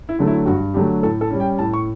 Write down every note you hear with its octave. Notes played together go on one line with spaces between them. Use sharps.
E4
D3 F#3 A3
E4
G2 F#4
D3 F#3 A3 G4
A2 A4
A4
G3 C#4
G5
A2 A5
C#6